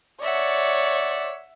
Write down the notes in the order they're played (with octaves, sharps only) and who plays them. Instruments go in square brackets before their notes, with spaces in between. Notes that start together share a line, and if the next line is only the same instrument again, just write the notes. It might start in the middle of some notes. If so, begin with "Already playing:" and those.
[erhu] C#5 [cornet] D5 [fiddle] E5 F#5